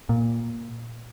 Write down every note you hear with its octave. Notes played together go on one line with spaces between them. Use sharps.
A#2